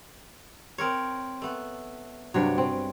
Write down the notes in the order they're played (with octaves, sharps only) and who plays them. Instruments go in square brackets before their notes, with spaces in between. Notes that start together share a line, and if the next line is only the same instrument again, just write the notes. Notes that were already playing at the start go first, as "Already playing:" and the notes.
[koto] C4 A#4 C#5
A3 B3
[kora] G2 C3 F#3 [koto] D4 C#5
[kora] C4 C#4